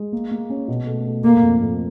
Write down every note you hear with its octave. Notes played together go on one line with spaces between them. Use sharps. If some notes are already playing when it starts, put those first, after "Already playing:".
Already playing: G#3
A#3
A#3
C#4
B2
A3
A3
A3 A#3
F2
F2